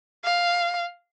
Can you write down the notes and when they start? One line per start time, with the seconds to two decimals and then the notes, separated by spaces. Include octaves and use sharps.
0.24 F5